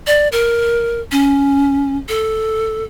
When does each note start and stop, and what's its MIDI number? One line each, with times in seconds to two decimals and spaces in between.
0.07 0.28 74
0.32 1.01 70
1.11 1.97 61
2.08 2.84 69